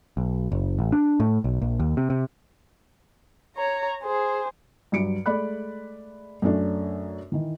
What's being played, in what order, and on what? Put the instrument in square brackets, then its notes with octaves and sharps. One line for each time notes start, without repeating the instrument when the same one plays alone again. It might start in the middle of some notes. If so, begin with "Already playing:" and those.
[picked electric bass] B1
F#1
A1
D4
A2
B1
A#1
D#2
C3
C3
[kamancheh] C#5 A#5
G#4 C5
[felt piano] G2 F#3 C#7 D7
G#3 A3 D5 B5 F#6
F#2 A3 C#4 D4
D#3 E3